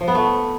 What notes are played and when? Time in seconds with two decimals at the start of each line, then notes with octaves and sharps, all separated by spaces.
0.01 F3
0.08 B3
0.15 A3